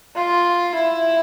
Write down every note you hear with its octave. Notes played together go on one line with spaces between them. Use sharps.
F4
E4